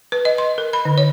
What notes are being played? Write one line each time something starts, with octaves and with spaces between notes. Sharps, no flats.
B4
D#5
C6
A#4
B5
D3
C#5